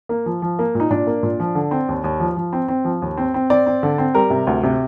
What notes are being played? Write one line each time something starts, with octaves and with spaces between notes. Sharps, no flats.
A#3
F3
F3
A#3
A#2
D#4
A#2 D4
A#3
A#2
F3
D3
C4
D#2
D#2
F3
F3
C4
C4
F3
D#2
C4
C4
C4 D5
C4
D3
C4
G3 A#4
C3
D2
C3